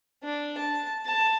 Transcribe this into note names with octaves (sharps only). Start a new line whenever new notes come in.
D4
A5
A5